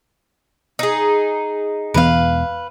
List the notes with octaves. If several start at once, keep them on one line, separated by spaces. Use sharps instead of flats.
D#4 G#4
E1 E3 B3 B4 F5